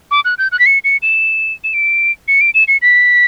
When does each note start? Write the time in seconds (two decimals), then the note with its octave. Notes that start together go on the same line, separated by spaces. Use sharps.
0.11 D6
0.25 F#6
0.38 G6
0.52 F#6
0.59 B6
0.66 C#7
0.84 C#7
1.02 E7
1.64 E7
1.74 D7
2.28 C#7
2.41 D7
2.54 E7
2.68 C#7
2.82 B6